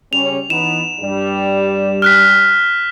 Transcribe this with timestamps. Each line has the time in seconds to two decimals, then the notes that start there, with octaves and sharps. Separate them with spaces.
0.13 C#3 G3 C#4 F7
0.50 E3 B3 D#4 E7
1.01 G2 G3
2.02 F6 F#6 B6